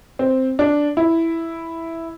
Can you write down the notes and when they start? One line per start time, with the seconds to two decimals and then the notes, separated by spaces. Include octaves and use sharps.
0.19 C4
0.59 D4
0.97 E4